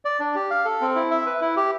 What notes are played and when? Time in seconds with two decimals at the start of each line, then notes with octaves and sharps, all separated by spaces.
0.05 D5
0.20 D4
0.35 G4
0.51 F5
0.65 A4
0.81 C4
0.95 E4
1.11 E5
1.26 B4
1.41 E4
1.57 G4